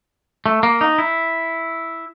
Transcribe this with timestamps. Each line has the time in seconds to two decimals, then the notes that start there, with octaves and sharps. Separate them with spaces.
0.46 A3
0.63 A#3
0.81 D#4
0.98 E4